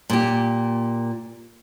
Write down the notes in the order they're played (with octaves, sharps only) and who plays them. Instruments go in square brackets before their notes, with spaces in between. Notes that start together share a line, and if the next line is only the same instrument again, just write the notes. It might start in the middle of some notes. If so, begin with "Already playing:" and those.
[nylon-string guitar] A#2 G4